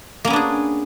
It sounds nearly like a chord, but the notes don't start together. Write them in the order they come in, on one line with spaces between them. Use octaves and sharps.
A#3 C#4 B3 D4 G#4